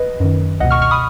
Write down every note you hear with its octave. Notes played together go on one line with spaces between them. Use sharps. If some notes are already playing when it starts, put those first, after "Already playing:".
Already playing: B4 D#5
F#2 D#3
C#2 B2 D#5 F#5
C#6 F6
C#6 F6
B5 D#6